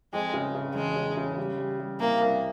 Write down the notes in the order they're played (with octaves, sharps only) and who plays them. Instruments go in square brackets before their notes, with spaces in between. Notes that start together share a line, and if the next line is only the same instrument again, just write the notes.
[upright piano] F2 [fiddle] G#3
[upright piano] C#3
C#3
[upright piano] E1 [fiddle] G#3
[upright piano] C#3
C#3
G3
G3
G3
[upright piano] C2 [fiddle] A#3
[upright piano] C2